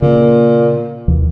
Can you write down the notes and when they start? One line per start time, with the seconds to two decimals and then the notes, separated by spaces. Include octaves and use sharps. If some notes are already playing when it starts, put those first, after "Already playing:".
0.02 A#2 C#3 A#3
1.08 D#2 C3 E3